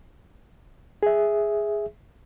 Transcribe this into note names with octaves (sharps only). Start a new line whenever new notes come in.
G#4 E5